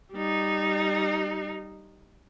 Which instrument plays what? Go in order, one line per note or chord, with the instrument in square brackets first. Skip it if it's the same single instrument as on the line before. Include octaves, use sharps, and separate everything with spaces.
[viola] G3 D#4